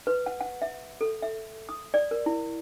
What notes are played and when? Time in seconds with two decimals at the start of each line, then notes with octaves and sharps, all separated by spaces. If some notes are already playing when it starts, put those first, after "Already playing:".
0.07 B4
0.26 F#5
0.41 F#5
0.62 E5
1.01 A4
1.22 E5
1.69 D#6
1.94 D5
2.11 A#4
2.26 E4